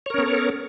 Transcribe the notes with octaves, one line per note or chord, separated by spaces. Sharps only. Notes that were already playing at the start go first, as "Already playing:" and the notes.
B3 C#4 A4 A#4 C#5